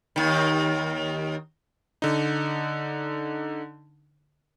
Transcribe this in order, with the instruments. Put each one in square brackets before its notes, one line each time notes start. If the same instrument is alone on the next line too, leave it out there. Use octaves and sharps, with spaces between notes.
[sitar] D#2 D#3
[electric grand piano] D3 D#4